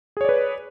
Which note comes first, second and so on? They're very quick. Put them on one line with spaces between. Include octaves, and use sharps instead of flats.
G#4 C#5 D5 B4